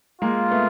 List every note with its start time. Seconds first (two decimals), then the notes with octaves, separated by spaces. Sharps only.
0.22 G#3 A#3 F4
0.51 A3 B3